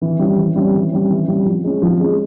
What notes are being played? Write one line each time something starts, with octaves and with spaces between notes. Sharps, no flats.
E3
G3 C#4
E3
G3 C#4
E3
G3 C#4
E3
G3 C#4
F3
G#3 C#4
F3
G#3 C#4